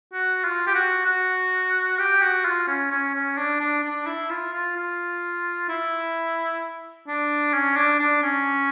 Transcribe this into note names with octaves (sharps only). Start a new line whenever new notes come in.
F#4
F4
G4
F#4
F#4
G4
F#4
F4
C#4
C#4
C#4
D4
D4
D4
E4
F4
F4
F4
E4
D4
C#4
D4
D4
C#4